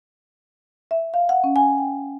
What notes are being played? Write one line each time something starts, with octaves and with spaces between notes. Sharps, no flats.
E5
F5
F#5
C#4
G#5
G5